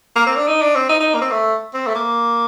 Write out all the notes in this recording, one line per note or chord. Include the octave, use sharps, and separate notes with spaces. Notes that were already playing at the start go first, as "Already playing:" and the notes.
A#3
C4
D4
D#4
D4
C4
D#4
D#4
A#3
C4
A3
C4
A3
A#3